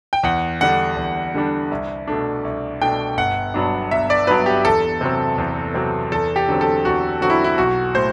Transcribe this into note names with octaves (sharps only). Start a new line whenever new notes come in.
G5
E2 F#5
D3 G3 D4 F#5
E2
D3 G3 D4
C2
B2 A3 D4
C2
B2 A3 D4 G5
G1 F#5
G2 F#3 B3 D4
G1 E5
D5
G2 F#3 B3 D4 B4
G4
E2 A4
C3 F#3 C4
E2
C3 F#3 C4
E2 A4
G4
D3 F#3 C4
A4
E2 F#4
D3 F#3 C4 F#4
E4
E4
B1 F#4
A2 C5